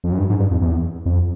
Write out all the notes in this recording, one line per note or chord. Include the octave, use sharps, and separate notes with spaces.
F2
F#2
G2
G#2
G2
F2
E2
F2